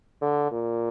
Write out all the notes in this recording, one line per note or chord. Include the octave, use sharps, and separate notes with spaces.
D3
A#2